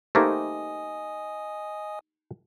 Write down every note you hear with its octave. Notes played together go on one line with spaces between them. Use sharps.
A3 A#3 D#4 G4 C5 D#5 G#5 D#6